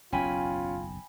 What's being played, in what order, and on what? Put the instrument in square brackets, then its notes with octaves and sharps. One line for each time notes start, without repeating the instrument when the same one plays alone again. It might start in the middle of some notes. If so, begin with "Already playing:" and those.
[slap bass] F#1 B1 E2 [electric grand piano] C#4 [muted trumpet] F4 [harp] G5 G#5 B5